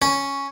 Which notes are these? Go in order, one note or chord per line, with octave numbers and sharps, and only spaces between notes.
C#4